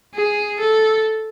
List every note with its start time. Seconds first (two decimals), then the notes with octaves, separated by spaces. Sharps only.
0.14 G#4
0.60 A4